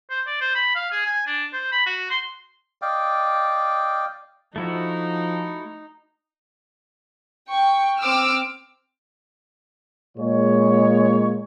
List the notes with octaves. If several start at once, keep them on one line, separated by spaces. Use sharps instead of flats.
C5
D5
C5
B5
F5
G#4
G#5
D4
C5
B5
F#4
C6
D5 D#5 F5 G5
F3 A3 D#4 E4 F#4
G5 C#6
C4 D6 E6 F6
A#2 G#3 C#5